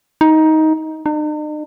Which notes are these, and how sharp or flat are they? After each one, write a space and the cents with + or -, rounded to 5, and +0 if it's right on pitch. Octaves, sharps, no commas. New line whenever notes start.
D#4 +15
D#4 -45